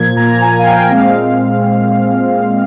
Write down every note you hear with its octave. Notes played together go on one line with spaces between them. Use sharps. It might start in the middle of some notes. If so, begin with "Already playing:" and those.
Already playing: A#2 F3 A#3 G#6
A#2 F3 A#3 A#5
G#5
F5
G5
A#2 G#3 C4 F5